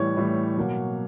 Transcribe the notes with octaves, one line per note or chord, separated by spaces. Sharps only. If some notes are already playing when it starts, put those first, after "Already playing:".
Already playing: A2 E3 G3 C#5
A2 E3 G3
B2 F#3 A#3